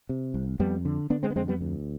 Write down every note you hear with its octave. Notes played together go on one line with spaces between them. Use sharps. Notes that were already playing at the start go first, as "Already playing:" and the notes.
C3
C2
F2 G3 B3
D3
D3 B3 D4
G#3 C4
B3
F2 G#3 C4
G3 B3
D2